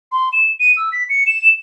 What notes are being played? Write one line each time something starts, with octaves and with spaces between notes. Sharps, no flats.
C6
E7
D#7
E6
B6
C#7
E7